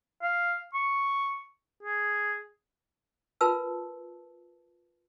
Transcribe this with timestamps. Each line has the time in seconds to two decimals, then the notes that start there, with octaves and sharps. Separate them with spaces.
0.23 F5
0.74 C#6
1.83 G#4
3.41 F4 A#4 B4 A5 E6